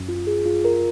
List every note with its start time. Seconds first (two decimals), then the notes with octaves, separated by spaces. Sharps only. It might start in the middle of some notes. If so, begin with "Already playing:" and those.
Already playing: F#2
0.09 F4
0.27 G#4
0.46 F4
0.65 A#4